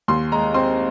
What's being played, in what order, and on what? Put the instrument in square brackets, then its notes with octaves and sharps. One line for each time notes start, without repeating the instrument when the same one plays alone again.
[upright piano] D#2 C6
G#3 A#5
C4 C6